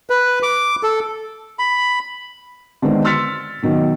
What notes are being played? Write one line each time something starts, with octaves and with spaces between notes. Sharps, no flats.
B4
D6
A4
B5
D3 D#3 G#3 B3 C4
C6 E6 F6 A6 B6 C#7
B2 D#3 F#3